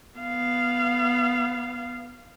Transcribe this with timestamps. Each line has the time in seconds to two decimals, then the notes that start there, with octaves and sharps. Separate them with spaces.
0.18 B3 F5